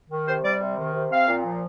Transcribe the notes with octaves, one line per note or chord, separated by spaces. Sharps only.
D#3
C3 C5
G3 D5
C3
D#3
C3
C4 F5
A#2
F3